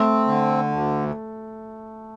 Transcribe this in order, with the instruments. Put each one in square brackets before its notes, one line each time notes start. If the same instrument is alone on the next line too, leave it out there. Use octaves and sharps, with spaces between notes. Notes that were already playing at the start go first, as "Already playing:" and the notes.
Already playing: [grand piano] A3 [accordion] C4
[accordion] D3
D2